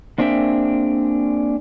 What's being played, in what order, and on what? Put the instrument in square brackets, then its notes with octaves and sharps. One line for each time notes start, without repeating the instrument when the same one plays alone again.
[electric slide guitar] A#3 C4 D4 G#4 E5 G5